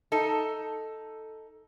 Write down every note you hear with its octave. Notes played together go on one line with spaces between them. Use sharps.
D#4 A4